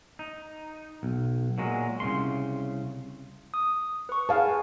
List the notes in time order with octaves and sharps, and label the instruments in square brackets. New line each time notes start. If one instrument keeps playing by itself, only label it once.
[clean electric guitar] D#4
B1
A#2 F#3 G#3
C2 G#2 C#3 C6
[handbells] D#6
B4 C#6
[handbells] G#4 G#5 A5 [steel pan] B4 F5 F#5